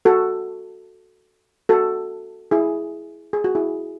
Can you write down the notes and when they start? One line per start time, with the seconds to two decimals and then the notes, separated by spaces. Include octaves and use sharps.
0.05 F#4 A4
1.69 F#4 A4
2.51 E4 G#4
3.33 G#4
3.44 F#4
3.55 E4 G#4